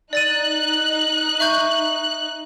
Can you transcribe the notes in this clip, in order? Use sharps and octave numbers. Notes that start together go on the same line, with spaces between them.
D#4 D5 F#6 A6 D#7
E5 C#6 G6